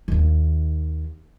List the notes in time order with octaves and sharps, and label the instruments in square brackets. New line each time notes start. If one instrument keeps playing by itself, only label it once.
[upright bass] D#2 D#3